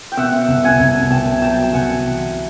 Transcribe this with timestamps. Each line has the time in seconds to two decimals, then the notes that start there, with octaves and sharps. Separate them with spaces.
0.12 G5
0.17 B2 E5 F#5
0.48 C2
0.64 F#5 G#5
0.79 C2
1.10 B2 G5 A5
1.42 F#3 G5 A5
1.73 C2 F#5 G#5
2.05 E3